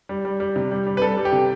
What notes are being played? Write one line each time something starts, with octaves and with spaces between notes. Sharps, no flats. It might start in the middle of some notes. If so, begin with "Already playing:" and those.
G3
G3
G3
C3
G3
G3
B4
G3 A4
G3
G4
C3